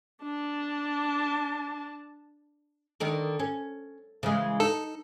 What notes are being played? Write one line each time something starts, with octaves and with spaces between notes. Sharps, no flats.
D4 A5
D3 D#3 A#4
C#4
C#3 E3 G#3
D#4 A4